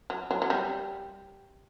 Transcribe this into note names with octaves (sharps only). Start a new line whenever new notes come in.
F#3
F#3
F#3
G3